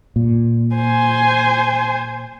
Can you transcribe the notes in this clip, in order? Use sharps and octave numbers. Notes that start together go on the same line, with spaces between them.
A#2
C5 G#5